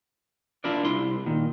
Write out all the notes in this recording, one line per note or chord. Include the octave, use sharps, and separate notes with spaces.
D4 E4 F4 A#4 D5
C2 E4 C6
A#2 D#3